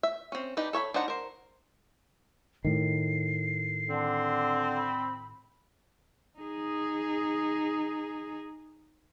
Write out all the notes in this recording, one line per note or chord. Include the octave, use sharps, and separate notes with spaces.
E5
C4 C#4
D4 D#4 G4 B4
A4 C#5 E5 B5
D4 D#4 C5 F#5 A#5
A#4 C5
A2 D#3 C7
D3 C4
B5
D#4 G#4